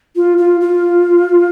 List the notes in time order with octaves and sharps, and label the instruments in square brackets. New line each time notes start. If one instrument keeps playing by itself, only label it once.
[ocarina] F4
F4
F4